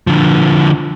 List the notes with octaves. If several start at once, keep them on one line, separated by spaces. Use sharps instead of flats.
D3 F3